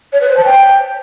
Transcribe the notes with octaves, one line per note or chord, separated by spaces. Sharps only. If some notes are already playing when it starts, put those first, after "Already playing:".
C#5
B4
C5
A5
G5